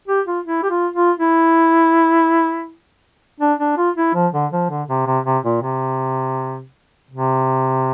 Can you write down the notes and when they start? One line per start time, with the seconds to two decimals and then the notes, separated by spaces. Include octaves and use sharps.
0.08 G4
0.27 F4
0.46 E4
0.63 G4
0.70 F4
0.94 F4
1.20 E4
3.40 D4
3.60 D4
3.78 F4
3.97 E4
4.14 F3
4.34 D3
4.52 F3
4.70 D3
4.89 C3
5.07 C3
5.26 C3
5.44 A#2
5.62 C3
7.11 C3